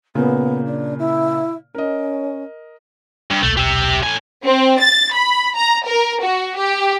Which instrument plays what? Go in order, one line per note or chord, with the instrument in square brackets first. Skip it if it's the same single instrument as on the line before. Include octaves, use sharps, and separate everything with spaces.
[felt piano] A#2 C#3 A#3 [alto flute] B3
[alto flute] D4
E4
[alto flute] C#4 [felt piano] A#4 D#5
[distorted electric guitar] G2
[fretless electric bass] D#1 B1 [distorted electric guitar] A3
[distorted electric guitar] G4 E5
A2 G#5
[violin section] C4
A6
B5
A#5
A#4
F#4
G4